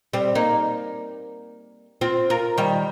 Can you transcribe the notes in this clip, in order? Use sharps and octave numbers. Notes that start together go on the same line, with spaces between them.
G3 C4
A#3 D#4
C4 F4
F4 A#4
D#3 G3